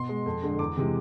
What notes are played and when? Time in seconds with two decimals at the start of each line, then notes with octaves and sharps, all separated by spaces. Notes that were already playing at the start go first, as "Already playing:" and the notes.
Already playing: B2 C6
0.09 G#3
0.26 F2
0.43 D3 G#3
0.59 E2 D6
0.77 C3 E3 G#3